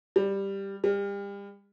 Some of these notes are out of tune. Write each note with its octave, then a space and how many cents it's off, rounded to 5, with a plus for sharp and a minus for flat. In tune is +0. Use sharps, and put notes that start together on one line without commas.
G3 +5
G3 +35